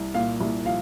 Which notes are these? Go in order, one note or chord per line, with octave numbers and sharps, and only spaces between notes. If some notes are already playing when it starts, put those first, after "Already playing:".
Already playing: C2
A#2 F5
C2
F3 F5